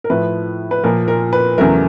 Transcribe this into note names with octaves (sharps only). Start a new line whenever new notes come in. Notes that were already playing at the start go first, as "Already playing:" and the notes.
A#4
A2 F3 A3 B4
B4
A#2 F3 A#3 A#4
A#4
B4
E2 C#3 F#3 A3 A#4